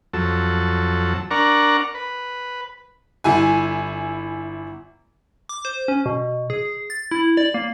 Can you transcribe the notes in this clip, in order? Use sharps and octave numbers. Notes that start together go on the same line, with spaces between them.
F2 F#3 A4
D4 A#4 D5 F#5 A#5 C#6
B4
G1 E4 G#5
D6
C5
C#4
B2
G#4
A6
E4
D5
A#3